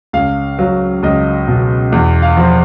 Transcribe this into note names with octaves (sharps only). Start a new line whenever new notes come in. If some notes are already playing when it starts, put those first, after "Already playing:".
C#2 F5
F#3 F5
C#2 D#5
B2
E2
F5
F3